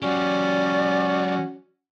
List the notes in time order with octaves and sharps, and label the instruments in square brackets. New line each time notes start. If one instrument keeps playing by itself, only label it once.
[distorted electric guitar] F#3 G4 [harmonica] C#4 F#4 [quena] D5